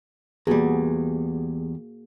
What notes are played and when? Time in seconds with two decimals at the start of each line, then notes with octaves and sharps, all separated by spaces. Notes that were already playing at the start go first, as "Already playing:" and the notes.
0.47 E2 G3 A#3 F#4 G#4